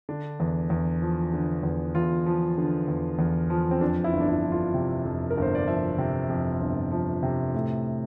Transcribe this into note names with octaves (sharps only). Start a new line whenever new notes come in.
D3 D4
E2
E2
F3
D3
E2
E2 F4
F3
D3
E2
E2
F3
C4
F2 D4
E4
G1
D4
E4
F3
F4
C3
F2
A#4
G1 C5
D5
F3 E5
C3
F2
G1
F3
C3
A2